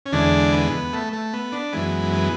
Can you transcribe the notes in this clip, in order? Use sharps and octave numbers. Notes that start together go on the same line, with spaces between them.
C#4
E2 D3 G#3 D4
B3
A3
A3
B3
D4
F#2 E3 G#3 B3
B3